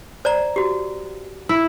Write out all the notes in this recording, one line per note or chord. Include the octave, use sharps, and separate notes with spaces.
C5 D5 A#5
F#4 G4
E4